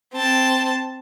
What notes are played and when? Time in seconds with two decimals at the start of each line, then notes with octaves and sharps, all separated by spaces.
0.14 C4 A5